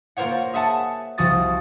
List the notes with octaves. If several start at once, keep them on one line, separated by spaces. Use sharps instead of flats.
A#3 F4 A#4 C5 C#5 F#5
G#4 E5 F#5 A5
C2 F3 F#4 D#6 A6